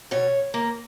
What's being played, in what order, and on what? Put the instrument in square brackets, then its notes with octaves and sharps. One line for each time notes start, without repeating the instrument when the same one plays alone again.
[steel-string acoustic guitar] B2 C#5
A#3